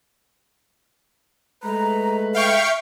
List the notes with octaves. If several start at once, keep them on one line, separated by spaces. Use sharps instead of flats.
G#3 A3 B4 A#5
E5 F5 G5 C#6